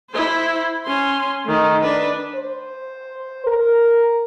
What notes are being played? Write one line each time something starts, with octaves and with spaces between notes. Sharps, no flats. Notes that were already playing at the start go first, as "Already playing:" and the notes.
E4 C5
C#4 C6
D#3 A3
D4 B4
C5
A#4